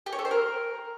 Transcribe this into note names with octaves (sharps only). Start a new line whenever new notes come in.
G4
C#5
A4
C5
A#4